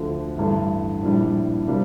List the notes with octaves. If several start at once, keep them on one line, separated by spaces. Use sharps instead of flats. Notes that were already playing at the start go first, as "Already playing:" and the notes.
Already playing: D2 D3 F3
A1 G2 D3 A3
A#1 A2 G3 D4
C3 G3 A#3 D4